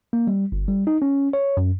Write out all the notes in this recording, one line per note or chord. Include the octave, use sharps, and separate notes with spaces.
A#3
G3
G1
G3
D#4
C#4
C#5
F#2